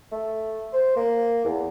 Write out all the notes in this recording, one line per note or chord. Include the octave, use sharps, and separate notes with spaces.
A3
C5
A#3
E2